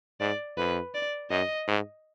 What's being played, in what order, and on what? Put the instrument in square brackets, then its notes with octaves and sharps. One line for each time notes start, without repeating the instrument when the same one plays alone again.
[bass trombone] G#2 [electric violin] D5
[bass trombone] F2 [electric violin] B4
[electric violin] D5
[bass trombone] F#2 [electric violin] D#5
[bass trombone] G#2